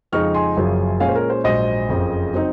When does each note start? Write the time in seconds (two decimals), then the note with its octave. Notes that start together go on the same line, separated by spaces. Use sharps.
0.12 F2 C#3 F3 G#3 D#4 C#6 F6
0.34 G#5 C6
0.56 F#1 F#2 C#3 F3
1.00 A#2 G#3 C#4 F5 G#5
1.09 C5
1.15 A#4
1.30 C5
1.44 A#1 G#2 F#3 C5 D#5
1.89 F#1 F2 C#3
2.34 F#3 C4 D#4